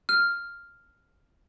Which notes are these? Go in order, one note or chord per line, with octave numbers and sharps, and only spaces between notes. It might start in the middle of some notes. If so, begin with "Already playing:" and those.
F6